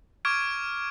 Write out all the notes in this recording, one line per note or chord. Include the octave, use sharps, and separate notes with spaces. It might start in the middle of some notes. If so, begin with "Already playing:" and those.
C#6 D6 F6 G#6 D7